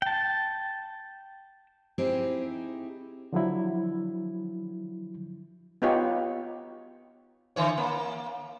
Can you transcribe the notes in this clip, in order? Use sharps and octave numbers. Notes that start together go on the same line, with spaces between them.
G5 A5
C4 D#4 E4 G4 G#4
D3 F3 F#3 E4
B3 D#4 F4 G4 C#5
D3 E3 C#5
A#3